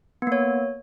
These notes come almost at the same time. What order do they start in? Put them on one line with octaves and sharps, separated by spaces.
B3 A#3 C#5